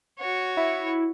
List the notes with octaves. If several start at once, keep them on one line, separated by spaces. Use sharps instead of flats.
F#4 C#5
E4